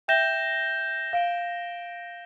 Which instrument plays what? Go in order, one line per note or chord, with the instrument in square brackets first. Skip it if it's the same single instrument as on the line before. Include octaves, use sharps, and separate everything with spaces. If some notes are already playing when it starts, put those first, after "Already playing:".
[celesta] E5 G5 [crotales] G6 A#6 E7 G7
[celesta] F5 [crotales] G6 D7 G7